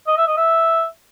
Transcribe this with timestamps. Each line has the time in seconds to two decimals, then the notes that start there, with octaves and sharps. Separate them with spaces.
0.07 D#5
0.17 E5
0.27 D#5
0.38 E5